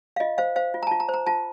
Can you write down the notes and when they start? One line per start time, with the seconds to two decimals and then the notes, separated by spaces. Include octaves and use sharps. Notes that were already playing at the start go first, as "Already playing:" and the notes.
0.16 F5
0.20 F4 D#5
0.38 C5 F5
0.56 C5 F5
0.74 F4
0.83 A#5
0.87 A5
0.91 F4
1.00 A#5
1.09 C5
1.14 A#5
1.26 F4 A5